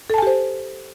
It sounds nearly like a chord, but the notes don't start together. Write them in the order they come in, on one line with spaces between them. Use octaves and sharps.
A4 A5 G#5 G4 C5